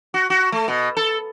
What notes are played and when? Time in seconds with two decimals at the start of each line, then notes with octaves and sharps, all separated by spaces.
0.14 F#4
0.30 F#4
0.52 A3
0.68 B2
0.97 A4